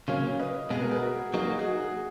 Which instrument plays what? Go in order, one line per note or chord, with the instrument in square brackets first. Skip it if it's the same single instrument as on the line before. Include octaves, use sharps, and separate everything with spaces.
[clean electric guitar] C#3 F#3 A#3 C#4 [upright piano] C#5 F5
[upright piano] B4 D#5
[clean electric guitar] B2 G#3 B3 [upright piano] G#4
[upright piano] F#4 A#4
G#4 B4
F#4 A#4
[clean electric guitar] F#3 A#3 D#4 [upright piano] G#4
[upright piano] F#4
G#4
F#4
G#4